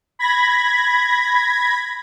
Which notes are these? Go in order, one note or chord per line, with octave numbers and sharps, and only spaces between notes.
B5 G#6 A#6